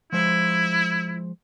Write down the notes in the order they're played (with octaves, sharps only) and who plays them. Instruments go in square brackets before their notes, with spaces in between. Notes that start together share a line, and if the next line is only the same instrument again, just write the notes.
[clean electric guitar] F3 G#3 C5 [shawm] E4